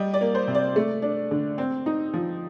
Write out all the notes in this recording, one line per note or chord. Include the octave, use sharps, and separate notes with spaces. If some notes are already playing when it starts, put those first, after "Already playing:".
Already playing: G3 D#5
D5
A#3
C5
C3
D5
A3
D4
D3
C4
D#4
F3